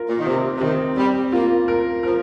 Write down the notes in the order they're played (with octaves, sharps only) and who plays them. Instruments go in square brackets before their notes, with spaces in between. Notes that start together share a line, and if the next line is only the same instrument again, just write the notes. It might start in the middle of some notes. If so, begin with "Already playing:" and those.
Already playing: [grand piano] F4 A#4
[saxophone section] A#2
D#3
[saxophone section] C3 [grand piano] C4
[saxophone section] C3
[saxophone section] D#3 [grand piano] C4
[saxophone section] G3 [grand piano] C4
[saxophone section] A#3 [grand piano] F4
[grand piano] A#4
[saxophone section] F3 [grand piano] A#4